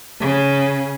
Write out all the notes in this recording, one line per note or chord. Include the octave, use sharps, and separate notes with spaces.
C#3